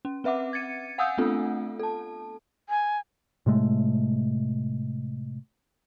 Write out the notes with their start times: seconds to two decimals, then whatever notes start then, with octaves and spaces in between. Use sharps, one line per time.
0.05 C#4
0.24 C4 B4 E5 F#5 D6
0.53 G#6 A6 C#7 D#7
0.98 F5 F#5 G#5 D#6 E6 G6
1.18 A3 B3 C4 D4 F4 A4
1.79 A4 A5
2.69 G#5
3.46 A2 C3 G#3 A3